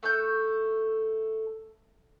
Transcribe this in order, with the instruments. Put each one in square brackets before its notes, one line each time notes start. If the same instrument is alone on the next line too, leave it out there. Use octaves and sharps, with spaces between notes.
[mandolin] A3 A4 F#6 G6